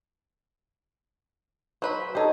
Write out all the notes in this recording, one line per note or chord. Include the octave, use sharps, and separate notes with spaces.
F#3 B4 C5 B5
D#4 G4 A4 C5 C#5